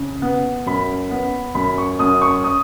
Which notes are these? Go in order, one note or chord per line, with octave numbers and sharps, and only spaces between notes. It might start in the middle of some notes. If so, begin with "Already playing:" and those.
Already playing: C#3
B3
F#2 B5
B3
F#2 B5
C#6
F#2 D#6
C#6
D#6